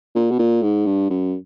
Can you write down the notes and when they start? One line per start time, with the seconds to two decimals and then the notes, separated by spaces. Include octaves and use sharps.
0.15 A#2
0.31 B2
0.39 A#2
0.62 G#2
0.86 G2
1.10 F#2